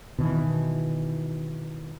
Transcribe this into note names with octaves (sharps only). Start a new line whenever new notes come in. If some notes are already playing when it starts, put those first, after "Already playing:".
B2 D#3 E3